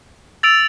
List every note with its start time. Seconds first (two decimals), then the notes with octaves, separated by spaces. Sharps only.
0.43 E6 A6 D7 F7